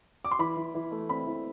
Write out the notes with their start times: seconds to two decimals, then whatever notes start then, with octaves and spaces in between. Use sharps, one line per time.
0.25 D6
0.31 C6
0.39 E3 B5
0.57 E3
0.75 E3
0.92 A3
1.09 C4 B5
1.27 E3